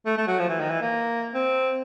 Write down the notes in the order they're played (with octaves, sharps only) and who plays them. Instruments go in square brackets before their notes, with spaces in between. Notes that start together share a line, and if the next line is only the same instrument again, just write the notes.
[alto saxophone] A3
A3
F#3
F3
E3
D#3
E3
A#3
C4